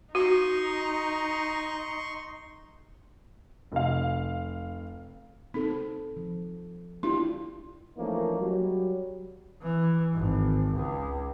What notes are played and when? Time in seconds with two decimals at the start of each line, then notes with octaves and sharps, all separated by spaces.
0.15 D#4 F#4 C6 C#6
3.72 F1 F5
5.54 C4 D#4 A4
6.17 F3
7.03 D4 E4 F4 G4
7.97 E3 F3 A3 A#3 C#4 D#4
8.39 F#3 G3
9.62 E3
10.14 G#1
10.74 C#2